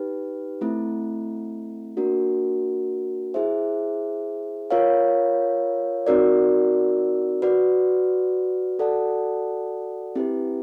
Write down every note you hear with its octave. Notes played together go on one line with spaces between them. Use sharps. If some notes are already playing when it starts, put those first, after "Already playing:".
Already playing: D#4 G4 B4
A3 C4 E4
A#3 D4 F#4 A#4
E4 G#4 C5 E5
F4 A#4 C#5 F5
C4 D#4 F#4 A#4 D5
F#4 B4 D5
F#4 A4 D5 F#5 A5
C4 E4 G4 B4